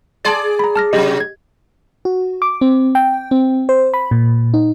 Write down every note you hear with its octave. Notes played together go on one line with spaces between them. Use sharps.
G#4 D5 A5 C6 A6
A#5 B5
A5 F6 A#6
C3 F#3 G4 D#5
G#6
F#4
D6
C4
G5
C4
C5
B5
A#2
D#4